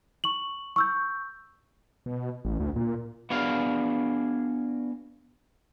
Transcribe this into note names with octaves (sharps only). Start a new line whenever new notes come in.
C#6 F#7
C#6 E6 G6
B2
A1
D2
A#2
B3 D4 F#4 G#4 F5